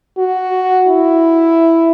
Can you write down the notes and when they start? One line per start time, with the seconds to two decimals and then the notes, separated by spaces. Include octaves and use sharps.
0.18 F#4
0.87 E4